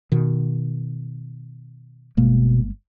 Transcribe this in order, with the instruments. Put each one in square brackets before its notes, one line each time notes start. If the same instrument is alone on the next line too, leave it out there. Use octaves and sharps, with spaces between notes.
[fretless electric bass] B2 D#3
[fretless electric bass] G1 G#3 A#3 [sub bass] B2